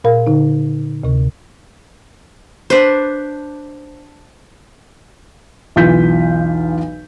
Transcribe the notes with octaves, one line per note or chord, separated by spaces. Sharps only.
A#2 A#4 F5
D3 D#4
D2 C3
D4 B4 C5
B1 E2 E3 F4 G6 B6